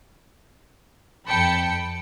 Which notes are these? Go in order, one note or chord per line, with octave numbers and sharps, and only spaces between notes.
F2 G5 A5 B5 C#7